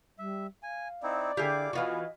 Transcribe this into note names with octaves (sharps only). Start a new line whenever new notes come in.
G3 E5
F5 G#5
C4 D#4 E4 D5
D3 E4 G4 G#4 F5 D6
E3 B3 F4 F#4 D#5